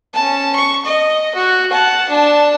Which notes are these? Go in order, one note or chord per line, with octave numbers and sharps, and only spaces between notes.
C#4 A5
C#6
D#5
F#4
F#5 A5
D4 A5